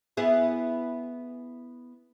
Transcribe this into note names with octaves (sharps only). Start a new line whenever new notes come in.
B3 E4 G#4